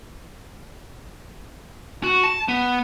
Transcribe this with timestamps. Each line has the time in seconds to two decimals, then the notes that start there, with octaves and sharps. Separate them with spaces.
2.03 F#4
2.24 A5
2.48 B3